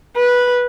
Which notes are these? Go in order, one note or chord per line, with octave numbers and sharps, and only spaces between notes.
B4